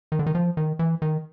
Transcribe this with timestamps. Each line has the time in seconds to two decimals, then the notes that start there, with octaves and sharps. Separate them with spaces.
0.12 D#3
0.19 D3
0.26 D#3
0.35 F3
0.57 D#3
0.79 E3
1.02 D#3